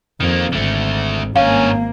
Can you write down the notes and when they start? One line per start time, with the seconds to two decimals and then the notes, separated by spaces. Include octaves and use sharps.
0.20 F2 D#3 A#3
0.53 G#1 D3 A3
1.36 G#1 G2 A#3 C#4 F5 G#5